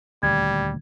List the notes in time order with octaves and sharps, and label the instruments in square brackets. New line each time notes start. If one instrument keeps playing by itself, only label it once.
[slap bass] D#1 D2 [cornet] G3 [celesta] G#6